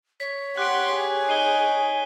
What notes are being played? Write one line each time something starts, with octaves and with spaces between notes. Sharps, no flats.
C#5 B6
G4 F#5 C6 F#6 D7
G#4
D#4 C7 D#7 G7